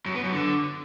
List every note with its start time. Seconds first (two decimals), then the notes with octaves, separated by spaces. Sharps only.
0.06 F#2
0.15 B3
0.24 F#2
0.33 D3